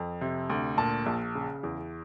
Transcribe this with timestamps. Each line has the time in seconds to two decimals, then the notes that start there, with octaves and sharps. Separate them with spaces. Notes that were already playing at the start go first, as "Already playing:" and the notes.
Already playing: F2
0.21 C3
0.50 D2
0.78 A#2 A5
1.06 A#1
1.35 C#3
1.63 E2